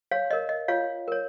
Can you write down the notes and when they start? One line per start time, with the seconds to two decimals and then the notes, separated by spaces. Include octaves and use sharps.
0.11 C#5 F5
0.31 A#4 C#5 D#5
0.49 D#5
0.68 F4 C#5 F5
1.08 A#4 C#5